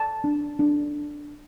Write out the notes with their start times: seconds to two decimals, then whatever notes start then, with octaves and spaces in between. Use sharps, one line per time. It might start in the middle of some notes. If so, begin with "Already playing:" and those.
Already playing: A5
0.24 D4
0.59 D4